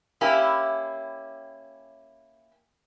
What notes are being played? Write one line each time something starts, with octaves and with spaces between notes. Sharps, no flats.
A#3 C#4 E4 G4